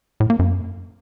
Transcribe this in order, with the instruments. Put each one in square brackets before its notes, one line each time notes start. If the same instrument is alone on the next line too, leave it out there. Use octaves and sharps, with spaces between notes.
[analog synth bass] A2
A#3
F#2